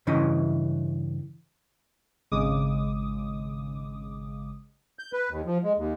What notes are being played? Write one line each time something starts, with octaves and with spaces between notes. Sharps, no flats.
G2 C#3 E3 C#4 E4 D#5
G#1 C#3 G#3 D6 D#6
G6
B4
D#2
F3
G#3
D#2